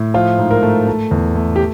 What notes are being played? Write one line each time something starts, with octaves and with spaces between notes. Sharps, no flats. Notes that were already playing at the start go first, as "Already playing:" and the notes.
Already playing: A2
F3 F4
G#2
A#4
A3
A3
E2
A3
G4